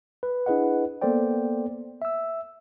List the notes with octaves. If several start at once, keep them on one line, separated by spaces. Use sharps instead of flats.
B4
D4 E4 G#4 B4 D#5 F#5
A#3 B3 A4 C5 D5 G5
E5 E6